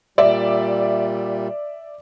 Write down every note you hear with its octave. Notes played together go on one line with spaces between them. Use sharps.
A#2 G3 D5 E5